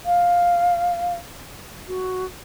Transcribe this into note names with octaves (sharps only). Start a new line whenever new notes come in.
F5
F#4